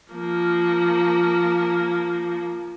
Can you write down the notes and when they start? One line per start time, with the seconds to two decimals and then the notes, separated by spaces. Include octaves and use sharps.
0.12 F3 A#3